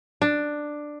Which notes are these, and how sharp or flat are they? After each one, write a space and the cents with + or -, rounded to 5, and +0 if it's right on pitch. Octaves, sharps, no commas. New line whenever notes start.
D4 +10